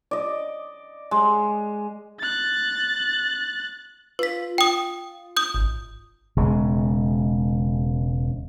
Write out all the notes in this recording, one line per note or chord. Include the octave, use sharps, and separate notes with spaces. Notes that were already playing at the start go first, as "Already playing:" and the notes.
D5 D#5
G#3
F#6 A6
F4 B4 B6
G5 D#6
D#6 G6
G#1
E1 C#3 G#3